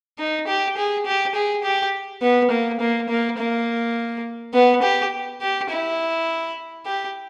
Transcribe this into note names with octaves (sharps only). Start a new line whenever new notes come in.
D#4
G4
G#4
G4
G#4
G4
B3
A#3
A#3
A#3
A#3
B3
G4
G4
E4
G4